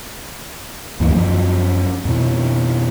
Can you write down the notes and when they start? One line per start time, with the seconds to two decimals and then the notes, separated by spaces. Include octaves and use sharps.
1.00 D2 G2 E3 A#3
1.14 F#2 F3
2.05 F2 B2